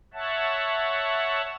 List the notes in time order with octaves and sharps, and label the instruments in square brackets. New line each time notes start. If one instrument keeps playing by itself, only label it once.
[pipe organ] C#5 E5 F#5 A5